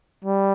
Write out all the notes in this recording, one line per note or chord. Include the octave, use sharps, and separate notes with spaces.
G3